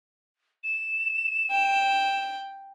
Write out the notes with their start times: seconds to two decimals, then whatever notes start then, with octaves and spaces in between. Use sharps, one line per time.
0.64 E7
1.51 G5